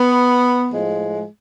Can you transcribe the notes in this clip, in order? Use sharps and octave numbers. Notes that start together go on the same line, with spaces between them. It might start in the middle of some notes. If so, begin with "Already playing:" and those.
Already playing: B3
A2 F3 G#3